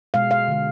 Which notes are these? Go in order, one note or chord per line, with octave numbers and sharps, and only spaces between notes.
B2 G#3 F5
F5
D3 G#3